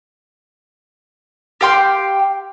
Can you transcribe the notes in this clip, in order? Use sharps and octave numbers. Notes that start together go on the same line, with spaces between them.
G4 F5 G5 C6